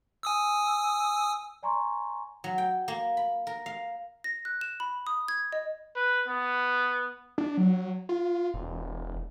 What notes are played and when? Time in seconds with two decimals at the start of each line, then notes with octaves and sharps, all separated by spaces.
0.23 G#5 D#6 E6
1.63 D5 G#5 A#5 C6 C#6
2.44 F#3
2.58 G5
2.88 A#3
3.17 B5
3.47 A#4
3.66 F5
4.24 A#6
4.45 F#6
4.61 E7
4.80 B5
5.07 D#6
5.28 G#6
5.52 D#5
5.96 B4
6.28 B3
7.38 D4
7.58 F#3
8.09 F4
8.54 E1